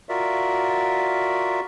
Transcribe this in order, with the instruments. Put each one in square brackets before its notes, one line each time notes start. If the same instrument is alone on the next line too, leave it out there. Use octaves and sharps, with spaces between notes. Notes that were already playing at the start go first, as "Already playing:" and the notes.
[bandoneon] F4 F#4 A#4 D5 E5